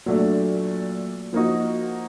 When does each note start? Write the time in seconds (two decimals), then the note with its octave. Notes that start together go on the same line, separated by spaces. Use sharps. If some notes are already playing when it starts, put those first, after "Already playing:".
0.06 A#2 F#3 A3 D4
1.33 F3 A#3 D#4 F#4